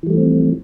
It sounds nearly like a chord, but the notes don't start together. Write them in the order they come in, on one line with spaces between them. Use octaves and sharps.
E3 G3 A3 F3 C4